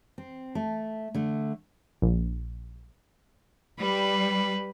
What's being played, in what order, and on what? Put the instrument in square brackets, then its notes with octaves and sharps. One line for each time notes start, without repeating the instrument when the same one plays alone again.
[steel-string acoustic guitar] C4
A3
D3 A3
[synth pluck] A#1
[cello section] G3 [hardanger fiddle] B4